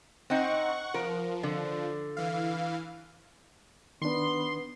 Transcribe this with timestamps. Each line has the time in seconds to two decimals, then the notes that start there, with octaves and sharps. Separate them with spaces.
0.30 C4 D#4 F#5 C#6
0.94 F3 A#4
1.43 D3
2.17 E3 F5
4.02 D#3 B3 D4 C6